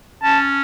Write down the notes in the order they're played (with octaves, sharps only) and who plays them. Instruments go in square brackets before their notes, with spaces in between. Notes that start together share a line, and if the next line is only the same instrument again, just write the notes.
[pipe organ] C#4 [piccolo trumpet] A5